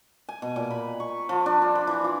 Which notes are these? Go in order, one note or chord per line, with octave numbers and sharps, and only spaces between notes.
G#5
B2
A#2
B5
C#6
F3
D4
C5
B5
E3
F4